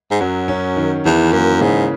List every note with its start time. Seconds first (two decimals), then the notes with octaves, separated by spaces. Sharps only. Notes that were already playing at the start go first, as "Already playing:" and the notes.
0.11 G#2
0.20 F#2 F#3
0.48 C#4
0.76 D#3
1.05 E2 E3
1.33 F#2 A#3
1.61 G#2 C#3